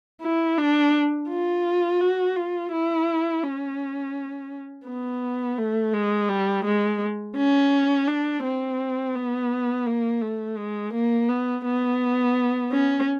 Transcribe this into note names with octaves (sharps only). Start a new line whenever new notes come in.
E4
D4
F4
F#4
F4
E4
C#4
B3
A3
G#3
G3
G#3
C#4
D4
C4
B3
A#3
A3
G#3
A#3
B3
B3
C#4